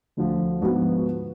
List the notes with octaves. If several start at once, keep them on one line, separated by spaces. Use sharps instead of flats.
D2 D3 F3
G#2 F3 B3 F#4 B4